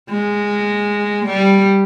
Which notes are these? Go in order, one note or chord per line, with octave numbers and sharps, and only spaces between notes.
G#3
G3